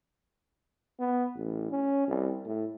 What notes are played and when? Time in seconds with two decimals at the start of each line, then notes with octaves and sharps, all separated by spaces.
1.00 B3
1.36 A1
1.71 C#4
2.08 C2
2.46 A2